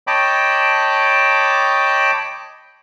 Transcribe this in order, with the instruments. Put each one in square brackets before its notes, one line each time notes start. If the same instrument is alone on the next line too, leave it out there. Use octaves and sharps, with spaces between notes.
[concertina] C#5 D#5 G5 A5 B5 D6